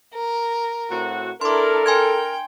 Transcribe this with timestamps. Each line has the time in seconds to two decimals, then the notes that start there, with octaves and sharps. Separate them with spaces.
0.14 A#4
0.90 A2 C4 F#4
1.41 D4 E4 A4 A#4 C6 D6
1.86 G5 G#5 C6 G#6